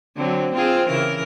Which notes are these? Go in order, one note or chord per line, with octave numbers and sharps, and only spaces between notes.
D3 F#3 C4
C4 F4 G#4
C#3 E3 A#4